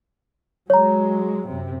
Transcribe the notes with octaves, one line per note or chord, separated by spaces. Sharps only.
F#3 G#3 C#5 A#5
F#2 C3